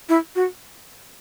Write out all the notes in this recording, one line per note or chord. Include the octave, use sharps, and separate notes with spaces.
E4
F#4